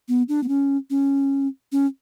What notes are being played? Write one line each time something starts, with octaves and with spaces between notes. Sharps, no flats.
B3
D4
B3
C#4
C#4
C#4